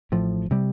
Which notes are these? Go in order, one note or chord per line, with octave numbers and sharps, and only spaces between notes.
A1 A2 F3
C3 G3